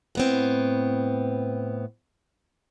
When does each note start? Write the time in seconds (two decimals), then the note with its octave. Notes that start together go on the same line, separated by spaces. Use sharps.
0.15 A2 B3 C4